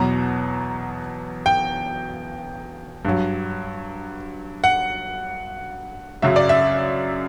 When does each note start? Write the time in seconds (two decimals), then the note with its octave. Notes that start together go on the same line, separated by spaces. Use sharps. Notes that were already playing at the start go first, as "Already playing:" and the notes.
Already playing: E2 B2 F#3 A#5
1.46 G5
3.05 G2 F#3
4.64 F#5
6.22 F#2 C#3 F#3 E5
6.36 D5
6.49 E5